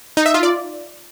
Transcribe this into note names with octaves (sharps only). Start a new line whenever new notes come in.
D#4
E5
F4
D5